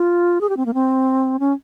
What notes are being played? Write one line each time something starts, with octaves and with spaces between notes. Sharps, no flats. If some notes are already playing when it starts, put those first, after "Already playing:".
Already playing: F4
G#4
G4
C4
A#3
C4
C#4